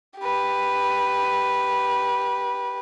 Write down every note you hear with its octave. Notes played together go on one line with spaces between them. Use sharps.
G4 B4